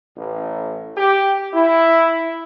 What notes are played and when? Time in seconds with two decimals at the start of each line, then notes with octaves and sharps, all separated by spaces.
0.16 A1
0.96 G4
1.53 E4